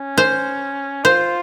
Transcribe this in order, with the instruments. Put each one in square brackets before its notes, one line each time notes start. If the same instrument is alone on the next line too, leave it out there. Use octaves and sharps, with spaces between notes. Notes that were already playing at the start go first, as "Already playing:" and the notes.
Already playing: [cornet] C#4
[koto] C5
[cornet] F4 [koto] C5